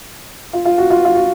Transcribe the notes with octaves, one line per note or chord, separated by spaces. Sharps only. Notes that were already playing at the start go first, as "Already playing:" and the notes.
F4
F4
F#4
F4
F4
F#4